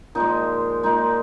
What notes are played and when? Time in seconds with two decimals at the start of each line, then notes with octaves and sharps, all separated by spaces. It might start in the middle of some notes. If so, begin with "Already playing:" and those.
0.15 A#2 F3 G#3 D#4
0.83 A#2 G#3 D#4